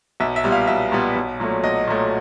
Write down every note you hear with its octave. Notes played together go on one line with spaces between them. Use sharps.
B1 E5
E5
A#2 G3 B3
F5
B1 E5
A#2 G3 B3
B1
A#2 F#3 A3
B1 D#5
A#2 F#3 A3